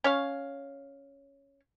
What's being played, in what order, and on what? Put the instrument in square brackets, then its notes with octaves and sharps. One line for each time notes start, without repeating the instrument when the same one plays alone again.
[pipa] C#4 C#5 F5